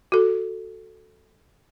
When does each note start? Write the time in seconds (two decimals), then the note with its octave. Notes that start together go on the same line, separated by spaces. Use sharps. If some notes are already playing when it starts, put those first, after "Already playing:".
0.12 F#4 A4